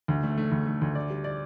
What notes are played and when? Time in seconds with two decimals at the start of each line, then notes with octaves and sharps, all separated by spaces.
0.08 D2
0.23 A3
0.38 A3
0.52 D2
0.66 A3
0.81 D2
0.95 D5
1.10 G3
1.24 D5